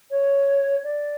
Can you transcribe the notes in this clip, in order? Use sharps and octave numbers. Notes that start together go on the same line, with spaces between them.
C#5
D5